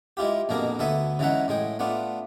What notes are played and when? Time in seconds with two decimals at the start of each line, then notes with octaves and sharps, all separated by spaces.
0.17 G#3 E4 F4 G4
0.49 A#1 F2 B2 A#3 G#4 A#4
0.79 D2 B3 A4 E5 G#5
1.19 C#3 E3 G#3 D#4 E5 F#5
1.48 A2 G#3 G#4 G5
1.79 A3 B3 D4 F4